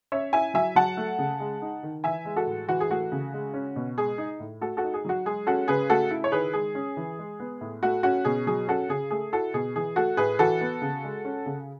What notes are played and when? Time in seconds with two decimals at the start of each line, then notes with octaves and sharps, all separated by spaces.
0.12 C#4 C#5 E5
0.32 E4 E5 G#5
0.54 F#3 E5 G#5
0.76 F#3 F#5 A5
0.97 A3
1.18 C#3
1.40 G#3
1.62 D#4
1.83 D#3
2.04 E3 E5 G#5
2.25 G#3
2.36 F#4 A4
2.47 A2
2.68 E3 F#4
2.80 G#4
2.91 A3 F#4
3.12 C#3
3.33 G#3
3.54 C#4
3.76 B2
3.97 G#3 G#4
4.18 D#4
4.40 A2
4.61 A3 F#4 A4
4.77 F#4 A4
4.83 D#4
4.94 G#4
5.05 F#3 F#4
5.25 G#3 G#4
5.47 C#4 F#4 A4
5.68 C#3 G#4 B4
5.90 A3 F#4 A4
6.11 E4
6.24 C#5
6.32 D#3 G#4 B4
6.53 G#3 G#4
6.75 C#4
6.97 E3
7.19 G#3
7.40 B3
7.61 A2
7.83 A3 F#4
8.03 C#4 F#4
8.25 B2 G#4
8.47 F#3 G#4
8.68 C#4 F#4 A4
8.89 C#3 G#4
9.10 A3 G#4
9.32 E4 F#4 A4
9.54 B2 G#4
9.76 E3 G#4
9.96 A3 F#4 A4
10.17 A2 G#4 B4
10.39 E3 F#4 A4
10.61 B3
10.82 C#3
11.04 G#3
11.25 C#4
11.46 C#3